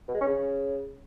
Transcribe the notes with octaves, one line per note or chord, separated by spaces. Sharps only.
B2
G#3
C#4
C#3